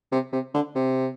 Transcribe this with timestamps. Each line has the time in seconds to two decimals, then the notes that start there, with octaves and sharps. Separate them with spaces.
0.12 C3
0.33 C3
0.54 D3
0.75 C3